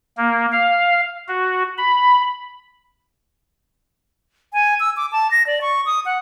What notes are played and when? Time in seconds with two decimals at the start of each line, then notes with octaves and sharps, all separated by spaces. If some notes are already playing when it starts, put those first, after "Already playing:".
0.17 A#3
0.52 F5
1.28 F#4
1.78 B5
4.53 G#5
4.80 E6
4.97 D6
5.12 A5
5.31 A#6
5.47 D5
5.61 C#6
5.86 D#6
6.06 F#5